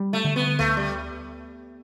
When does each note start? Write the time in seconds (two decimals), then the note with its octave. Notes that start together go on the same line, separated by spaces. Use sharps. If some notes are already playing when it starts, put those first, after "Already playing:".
Already playing: G3
0.13 A3
0.24 D3
0.36 B3
0.59 D2 A3
0.77 G3